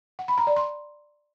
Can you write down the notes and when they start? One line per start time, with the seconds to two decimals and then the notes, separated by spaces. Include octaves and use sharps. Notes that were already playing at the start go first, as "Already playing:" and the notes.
0.19 F#5
0.28 B5
0.38 A#5
0.47 D5
0.56 C6